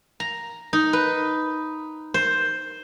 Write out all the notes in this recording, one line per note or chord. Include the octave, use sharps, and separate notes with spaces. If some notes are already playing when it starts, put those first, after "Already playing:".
A#5
D#4
B4
C5